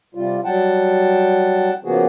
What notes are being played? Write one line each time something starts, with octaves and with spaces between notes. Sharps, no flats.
C3 G3 F4
F#3 G3 F#5 G5 A5
C#3 F3 A#3 B3 F#4 G#4